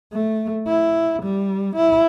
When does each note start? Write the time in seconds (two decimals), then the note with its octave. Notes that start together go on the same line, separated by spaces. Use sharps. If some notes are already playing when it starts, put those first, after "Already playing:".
0.13 A3
0.67 E4
1.23 G3
1.76 E4